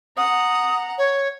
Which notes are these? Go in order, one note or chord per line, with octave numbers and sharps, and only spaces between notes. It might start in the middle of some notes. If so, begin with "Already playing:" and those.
F#5 A#5 D#6
C#5